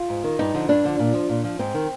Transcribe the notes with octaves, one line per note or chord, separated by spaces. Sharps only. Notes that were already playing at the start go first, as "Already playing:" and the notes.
Already playing: F4
G#2
D#3
G2 D#4
D3 F3
G2 D4
D3 F3
A#2
F3
A#2
F3
G#2 C4
D#3